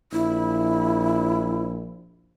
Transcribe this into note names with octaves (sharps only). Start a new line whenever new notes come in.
A#1 E4